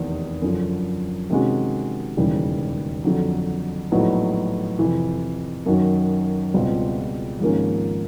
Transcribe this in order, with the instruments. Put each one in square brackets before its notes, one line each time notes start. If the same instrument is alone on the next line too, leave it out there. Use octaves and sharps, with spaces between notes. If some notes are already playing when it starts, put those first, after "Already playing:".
Already playing: [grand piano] F1 E2 C3 D#3
F#2 D3 F3
C3 D#3 G#3 C#4 F#4
E1 D#2 C#3 E3 G3
F2 D3 F#3
A#1 A2 F#3 B3 D#4
F2 C3 E3
F#2 D#3 F#3
C#2 B2 G3 C4 F4
G#1 G#2 F3 A#3 C#4